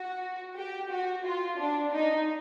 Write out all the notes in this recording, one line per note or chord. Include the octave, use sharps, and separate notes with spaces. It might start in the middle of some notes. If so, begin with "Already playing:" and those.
Already playing: F#4
G4
F#4
F4
D4
D#4